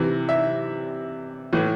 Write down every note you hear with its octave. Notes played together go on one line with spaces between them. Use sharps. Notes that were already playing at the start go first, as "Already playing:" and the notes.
Already playing: C3 E3
E5
A2 E3